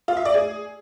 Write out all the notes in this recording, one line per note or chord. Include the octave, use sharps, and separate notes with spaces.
F4
E5
D5
G#4